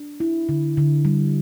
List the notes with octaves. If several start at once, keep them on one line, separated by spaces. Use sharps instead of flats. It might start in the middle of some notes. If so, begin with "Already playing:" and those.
Already playing: D4
E4
D3
D3
G3